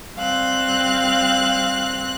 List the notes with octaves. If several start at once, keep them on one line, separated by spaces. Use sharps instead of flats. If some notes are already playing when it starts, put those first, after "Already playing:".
G3 C4 F5 F#6